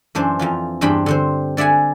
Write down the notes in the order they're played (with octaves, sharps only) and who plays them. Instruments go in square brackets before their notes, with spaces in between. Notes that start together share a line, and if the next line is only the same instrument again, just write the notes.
[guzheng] F#2 E3 D4 C5
F2 E3 F4
E2 G2 D4 C5 G5 B5
D3 C4 C5
D3 D5 E5 F#5 G#5